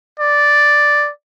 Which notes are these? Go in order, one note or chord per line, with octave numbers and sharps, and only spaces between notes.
D5